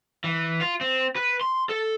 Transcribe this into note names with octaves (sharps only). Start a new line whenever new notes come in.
E3
F4
C4
B4
C6
A4